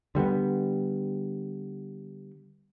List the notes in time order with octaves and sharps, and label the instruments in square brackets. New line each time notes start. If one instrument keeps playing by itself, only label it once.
[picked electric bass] D3 G3 A3 B3